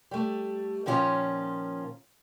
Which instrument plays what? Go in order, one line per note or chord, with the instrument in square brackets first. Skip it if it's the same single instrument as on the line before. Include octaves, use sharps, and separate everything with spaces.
[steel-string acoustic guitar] G3 A3
A#2 D#3 F3 C#4 F4 C#5